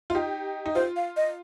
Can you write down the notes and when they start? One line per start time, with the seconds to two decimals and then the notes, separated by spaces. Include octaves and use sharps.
0.10 F4
0.15 D#4 G4
0.66 D#4
0.75 F4 C5
0.96 F5
1.17 D#5